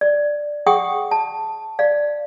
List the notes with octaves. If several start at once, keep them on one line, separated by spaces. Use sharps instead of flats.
D5
G#4 F#5 G5 C#6 D#6
A5
D5 F5